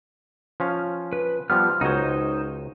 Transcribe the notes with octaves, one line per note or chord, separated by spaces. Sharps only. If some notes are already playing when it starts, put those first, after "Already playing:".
F3 C#4 F5
B4
F3 G3 B3 F6
C#2 D#4 F#4 C5 C#5